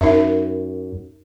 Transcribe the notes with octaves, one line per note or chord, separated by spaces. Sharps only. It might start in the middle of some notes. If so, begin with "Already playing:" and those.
F#2 D#4 A#4 E5